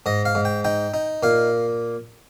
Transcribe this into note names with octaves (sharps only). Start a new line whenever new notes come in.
G#2 D#5
F5
G#2
G5
D#4 G5
D#4
A#2 F5